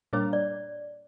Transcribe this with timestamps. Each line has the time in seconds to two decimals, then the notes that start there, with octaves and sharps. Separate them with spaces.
0.13 A#2 G3 A#3 D4 C#5
0.33 D5